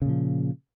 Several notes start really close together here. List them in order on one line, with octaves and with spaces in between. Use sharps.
C#3 A#2 F3